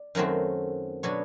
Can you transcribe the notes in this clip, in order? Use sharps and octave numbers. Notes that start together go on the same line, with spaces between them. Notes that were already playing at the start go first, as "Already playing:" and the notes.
Already playing: D5
F#2 D#3 F#3 A3 C4
B2 F#3 B3 D4 C#5